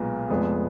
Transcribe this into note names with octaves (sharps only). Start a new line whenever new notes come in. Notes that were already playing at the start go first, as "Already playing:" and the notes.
Already playing: B1 A#2 G#3 B3
F1 F2 F3 G#3 B3